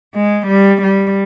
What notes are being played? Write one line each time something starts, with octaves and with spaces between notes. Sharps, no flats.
G#3
G3
G3